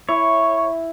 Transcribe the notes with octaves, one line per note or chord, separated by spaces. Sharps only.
E4 C#5